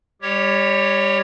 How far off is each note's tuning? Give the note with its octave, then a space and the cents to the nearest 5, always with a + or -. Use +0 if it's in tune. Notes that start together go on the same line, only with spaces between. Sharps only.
G3 +35 G4 +0 C#5 +0